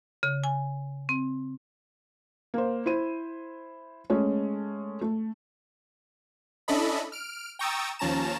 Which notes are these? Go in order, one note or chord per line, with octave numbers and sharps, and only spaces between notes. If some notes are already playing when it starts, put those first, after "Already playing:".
C#3
G#5
C4
A#3 C5
E4 C5 D#7
G#3 A3 C#4
A3
C#4 D4 E4 A4 D#5 B5
F6 D7
G5 A#5 C#6 D#6 E6 A6
D#2 F3 C#4 A5 A#5 E7